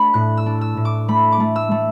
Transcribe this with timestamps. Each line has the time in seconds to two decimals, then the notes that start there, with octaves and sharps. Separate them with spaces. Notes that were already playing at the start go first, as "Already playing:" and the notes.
Already playing: A3 D4 B5
0.14 A2 F#6
0.37 E6
0.46 D4
0.61 E6
0.77 A2
0.85 D6
1.08 A3 B5
1.32 D6
1.40 A3
1.56 E6
1.71 A3